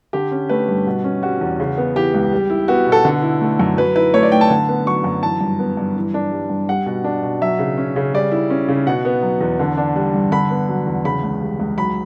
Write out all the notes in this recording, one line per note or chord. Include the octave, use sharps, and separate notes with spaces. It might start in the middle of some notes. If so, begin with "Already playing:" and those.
D3 G4
C#4
A3 B4
G2
B2
C#4
G3 F#4
E2
C#3
B3
E3 G4
C#2
G3
E4
B3 F#4
B2
A4
D3
E4
A3
F#2
F#3 B4
E4 B4
A3 C#5
D5
A2 G5
A5
D3
B3
F#3 C#6
F#2
E3 A5
G2
B3
G2
E3
D4
G3
G2
G3 F#5
B2
D4
B2
F#3 E5
C#3
C#4
C#3
G3 D5
E4
C#4
C#3
B2 F#5
B3
F#3
E2
D3
D4
G3
G2
D3 B5
B3
F#3
E2
C#3 B5
C#2
G3
C#2
F#3 B5